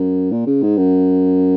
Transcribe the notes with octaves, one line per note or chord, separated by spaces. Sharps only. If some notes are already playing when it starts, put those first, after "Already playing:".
Already playing: F#2
A#2
C#3
G#2
F#2